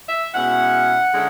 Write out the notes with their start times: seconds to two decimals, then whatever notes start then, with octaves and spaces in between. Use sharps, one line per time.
0.09 E5
0.34 B2 G#3 C#4 E4 F#5
1.12 D3 G#3 C#4 E4